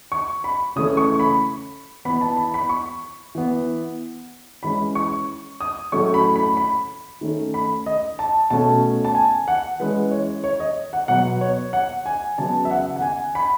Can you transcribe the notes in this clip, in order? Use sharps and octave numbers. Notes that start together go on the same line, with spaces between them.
C#6
B5
C#3 E3 A3 C#4 D#6
C#6
B5
E3 B3 B5
A5
B5
B5
C#6
E3 B3
E3 G#3 C#4 B5
C#6
D#6
A2 F#3 A3 C#4 C#6
B5
B5
B5
D#3 A3 C#4
B5
D#5
A5
B2 A3 C#4 A5
A5
G#5
F#5
E3 G#3 C#4 B4
C#5
C#5
D#5
F#5
B2 F#3 B3 F#5
C#5
F#5
G#5
C#3 F#3 B3 A5
E5
F#5
F#5
G#5
B5